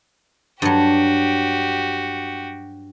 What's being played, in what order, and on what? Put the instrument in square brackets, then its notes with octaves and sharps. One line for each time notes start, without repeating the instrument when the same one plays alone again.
[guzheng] G2 F#3 [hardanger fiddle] F#4 G4